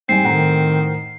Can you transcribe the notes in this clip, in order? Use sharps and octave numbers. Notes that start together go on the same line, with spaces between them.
G#2 G3 C4 G#5 C7
A2 D#3 F#5 A#5